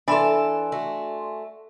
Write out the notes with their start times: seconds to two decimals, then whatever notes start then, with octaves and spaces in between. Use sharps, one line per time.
0.08 E3 D4 A4 D5 E5 G#5 B5 C6
0.72 A3 F#4